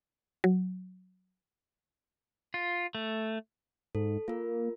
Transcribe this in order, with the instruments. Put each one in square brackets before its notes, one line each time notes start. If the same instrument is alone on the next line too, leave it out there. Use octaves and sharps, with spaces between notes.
[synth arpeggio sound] F#3
[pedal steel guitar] F4
A3
[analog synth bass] G#2 [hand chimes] A4
[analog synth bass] A#3 [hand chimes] F4 A#4